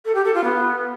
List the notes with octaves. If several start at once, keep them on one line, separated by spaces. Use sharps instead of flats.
A4
G4
A4
F4
B3